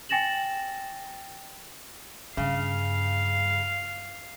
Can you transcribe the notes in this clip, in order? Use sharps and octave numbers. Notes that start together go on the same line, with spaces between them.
G5 G#5 A6 A#6 E7 F#7
G2 C#3 F5